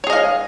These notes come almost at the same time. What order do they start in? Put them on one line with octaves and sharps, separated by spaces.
C#5 G#4 D#5 F5